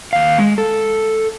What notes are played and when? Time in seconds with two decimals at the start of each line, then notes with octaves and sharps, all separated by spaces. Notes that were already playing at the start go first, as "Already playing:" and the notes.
0.13 D#2 F5
0.38 G#3
0.58 A4